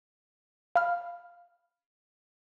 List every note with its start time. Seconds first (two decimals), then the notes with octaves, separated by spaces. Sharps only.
0.76 F5 B5 F6